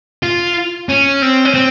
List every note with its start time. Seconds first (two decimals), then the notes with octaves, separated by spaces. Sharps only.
0.23 F4
0.89 C#4
1.22 C4
1.45 C#4
1.54 C4